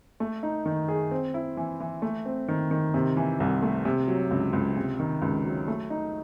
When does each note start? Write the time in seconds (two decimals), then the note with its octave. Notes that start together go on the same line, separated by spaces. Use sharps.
0.20 A3
0.43 D#4
0.66 D#3
0.88 G#4
1.11 C4
1.34 E4
1.57 E3
1.80 E3
2.02 A3
2.26 C4
2.48 D#3
2.71 D#3
2.94 C3
3.17 E3
3.40 C2
3.62 A3
3.85 C3
4.08 F#3
4.31 C#2
4.53 C#2
4.77 C3
5.00 D#3
5.22 C#2
5.45 F#3
5.68 A3
5.90 D#4